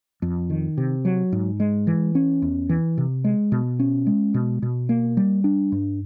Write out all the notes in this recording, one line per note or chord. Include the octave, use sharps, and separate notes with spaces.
F2
D#3
C3
F#3
G#2
G#3
E3
C#4
E2
E3
C3
G#3
B2
C#4
G#3
B2
B2
A#3
G3
D4
G2